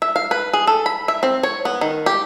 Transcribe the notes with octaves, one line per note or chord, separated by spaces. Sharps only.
E5
F5
B4
G#4
A4
B5
E5
C4
C#5
B3
D#3
G4